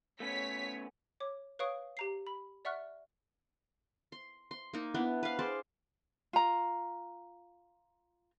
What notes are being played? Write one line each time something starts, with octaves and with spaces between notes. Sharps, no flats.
A3 B3 C#4 C#5 B6
C#5 D6
B4 C#5 F5 C#6 D#6 D7
G4 A#5 C7
B5
D5 E5 F#5 C#6 F6 F#6
C6
C6
A#3 D#4
B3 D4 E4
B4 F5
G#4 C5 D5 A5
F4 A#5